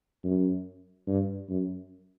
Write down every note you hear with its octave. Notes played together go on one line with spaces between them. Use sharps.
F#2
G2
F#2